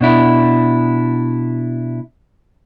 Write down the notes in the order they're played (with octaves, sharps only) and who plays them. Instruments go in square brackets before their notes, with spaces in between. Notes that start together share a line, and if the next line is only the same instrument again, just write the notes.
[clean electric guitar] B2 D4 E4